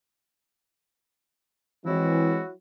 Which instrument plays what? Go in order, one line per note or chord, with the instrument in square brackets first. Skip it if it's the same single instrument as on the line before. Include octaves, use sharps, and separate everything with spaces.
[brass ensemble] E3 G#3 C4 [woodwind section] F#3 E4 F#4